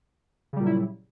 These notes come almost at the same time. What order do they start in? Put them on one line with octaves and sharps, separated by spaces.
C#3 G3 A#2 F#3 E4